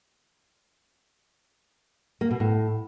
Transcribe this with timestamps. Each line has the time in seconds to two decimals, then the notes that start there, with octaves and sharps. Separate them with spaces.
2.21 A#3
2.31 B2
2.40 A2